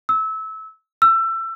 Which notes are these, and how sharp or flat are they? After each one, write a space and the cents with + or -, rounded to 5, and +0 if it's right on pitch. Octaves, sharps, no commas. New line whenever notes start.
E6 -25
E6 +25